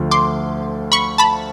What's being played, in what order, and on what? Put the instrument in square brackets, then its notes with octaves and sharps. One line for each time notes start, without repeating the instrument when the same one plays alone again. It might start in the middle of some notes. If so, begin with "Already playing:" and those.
Already playing: [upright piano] D2 D3 F3 A3
[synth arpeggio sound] C6 D6
B5 C#6
A5 B5